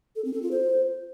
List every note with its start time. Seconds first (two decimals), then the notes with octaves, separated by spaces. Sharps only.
0.16 A4
0.25 C4
0.34 A4
0.42 F4
0.51 C5